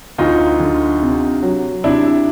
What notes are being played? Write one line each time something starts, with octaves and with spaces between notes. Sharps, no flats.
D2 D#4 F4
D3
C3
F#3
C3 D4 E4